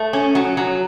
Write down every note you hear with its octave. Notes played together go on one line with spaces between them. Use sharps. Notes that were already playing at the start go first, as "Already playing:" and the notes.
Already playing: A3
C#4
F#3
F#3